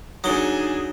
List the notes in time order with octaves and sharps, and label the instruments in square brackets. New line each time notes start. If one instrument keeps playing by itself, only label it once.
[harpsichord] F#3 [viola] D4 G#4 [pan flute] D#4 [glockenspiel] D#6 G7